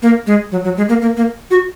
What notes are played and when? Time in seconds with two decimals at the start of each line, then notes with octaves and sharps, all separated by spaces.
0.02 A#3
0.27 G#3
0.52 F#3
0.64 F#3
0.77 G#3
0.89 A#3
1.01 A#3
1.17 A#3
1.51 F#4